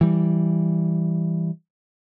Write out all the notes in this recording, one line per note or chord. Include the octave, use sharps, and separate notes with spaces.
E3 G3